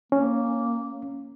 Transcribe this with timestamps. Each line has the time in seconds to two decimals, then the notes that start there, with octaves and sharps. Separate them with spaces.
0.12 A#3 C#4